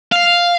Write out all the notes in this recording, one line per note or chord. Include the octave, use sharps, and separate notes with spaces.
F5